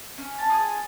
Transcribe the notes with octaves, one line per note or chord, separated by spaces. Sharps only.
C#4 G#5
A5
F4 G#4
G#5